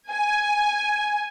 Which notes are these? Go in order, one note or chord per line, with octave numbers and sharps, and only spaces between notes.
G#5